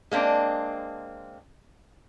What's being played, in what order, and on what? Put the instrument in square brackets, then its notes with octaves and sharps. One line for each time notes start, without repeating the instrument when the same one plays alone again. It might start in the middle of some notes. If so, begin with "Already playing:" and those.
[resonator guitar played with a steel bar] G#3 A#3 C4 D4